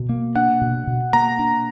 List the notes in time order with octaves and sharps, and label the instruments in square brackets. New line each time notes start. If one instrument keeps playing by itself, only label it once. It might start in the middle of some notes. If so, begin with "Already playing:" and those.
Already playing: [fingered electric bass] B2
A#3
[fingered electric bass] D4 [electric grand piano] F#5
[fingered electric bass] B2
B2
[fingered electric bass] A#3 [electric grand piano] A#5
[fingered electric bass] D4